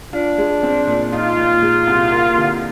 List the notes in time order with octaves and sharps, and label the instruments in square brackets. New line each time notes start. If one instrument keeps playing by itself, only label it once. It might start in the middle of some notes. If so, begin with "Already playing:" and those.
[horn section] D4 [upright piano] F4
[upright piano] G#3
C4
A#2
[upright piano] D#4 [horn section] F4
[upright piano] A#2
G#3
C2
A#3
D3